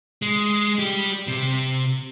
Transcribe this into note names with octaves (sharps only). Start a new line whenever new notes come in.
G#3
G3 G4
C3